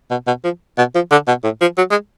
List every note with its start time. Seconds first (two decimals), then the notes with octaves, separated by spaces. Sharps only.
0.11 B2
0.27 B2
0.44 F3
0.78 B2
0.95 F3
1.11 D3
1.28 B2
1.44 A2
1.61 F3
1.77 F#3
1.91 G#3